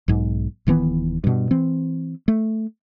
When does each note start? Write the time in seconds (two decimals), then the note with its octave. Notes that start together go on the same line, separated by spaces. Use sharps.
0.08 B1 G#2
0.67 D1 D#3 E3 B3
1.24 G2 B2
1.51 E3 C4
2.28 A3